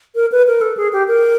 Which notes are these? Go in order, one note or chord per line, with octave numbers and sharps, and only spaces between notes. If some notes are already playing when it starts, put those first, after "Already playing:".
A#4
B4
A#4
A4
G#4
G4
A#4